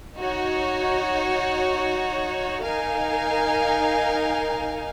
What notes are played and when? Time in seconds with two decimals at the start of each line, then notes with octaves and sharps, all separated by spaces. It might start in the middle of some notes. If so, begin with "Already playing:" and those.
0.16 D#4 F#4 C#5
2.63 D#4 A#4 F5 G#5